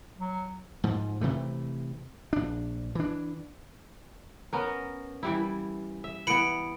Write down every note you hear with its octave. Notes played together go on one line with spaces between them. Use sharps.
F#3
G#2 F3
C3 E3 A3
A#1 D4
E3 D4
B3 C#4 A#4
E3 G3 E4
E5
E3 B3 B5 C#7 D7